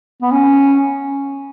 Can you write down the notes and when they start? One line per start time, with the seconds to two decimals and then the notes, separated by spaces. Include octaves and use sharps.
0.22 B3
0.31 C#4